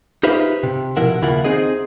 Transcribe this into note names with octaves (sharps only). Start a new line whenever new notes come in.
D#4 F4 G4 B4 C5 E5
C3
B2 F3 E4 A#4 F#5
D#2 C#3 E4 F4 A#4 F#5
C4 D#4 G#4 D#5